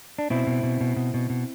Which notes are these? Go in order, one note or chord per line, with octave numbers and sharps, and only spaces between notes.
D4
B2 C4 E4
B2
B2
B2
B2
B2
B2